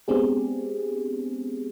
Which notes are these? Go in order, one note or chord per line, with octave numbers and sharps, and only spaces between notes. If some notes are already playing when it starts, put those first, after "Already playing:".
G#3 B3 C4 D4 G4 G#4